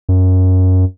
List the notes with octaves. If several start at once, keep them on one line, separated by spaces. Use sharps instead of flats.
F#2